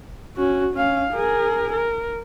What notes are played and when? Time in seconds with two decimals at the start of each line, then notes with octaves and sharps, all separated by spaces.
0.36 C#4 F#4
0.75 C#4 F5
1.13 G#4 A#4
1.73 A#4